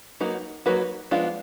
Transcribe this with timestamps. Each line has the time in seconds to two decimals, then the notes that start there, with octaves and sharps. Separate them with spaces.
0.20 F#3 A#3 D#4 F#4 B4
0.66 F#3 A#3 D#4 F#4 B4
1.11 F3 G#3 B3 D4 F4